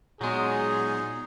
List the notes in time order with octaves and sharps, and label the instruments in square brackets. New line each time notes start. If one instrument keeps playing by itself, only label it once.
[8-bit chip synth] A#2 B3 [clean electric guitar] F#3 G#3 [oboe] D#4 [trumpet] G#4